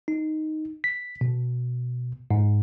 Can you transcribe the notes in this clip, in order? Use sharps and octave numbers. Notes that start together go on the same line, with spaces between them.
D#4
B6
B2
G#2